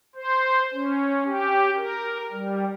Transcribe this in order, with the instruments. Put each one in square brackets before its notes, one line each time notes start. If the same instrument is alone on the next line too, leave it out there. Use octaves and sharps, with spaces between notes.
[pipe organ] C5
C#4
G4
A#4
G3